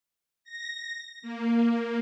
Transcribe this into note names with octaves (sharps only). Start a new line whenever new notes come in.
A#6
A#3